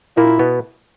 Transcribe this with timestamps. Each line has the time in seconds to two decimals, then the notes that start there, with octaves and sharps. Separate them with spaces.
0.17 A#2 A#3 E4
0.39 B2 B3